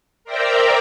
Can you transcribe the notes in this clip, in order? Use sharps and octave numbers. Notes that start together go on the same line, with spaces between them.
A#4 C5 D5 E5 G5 A#5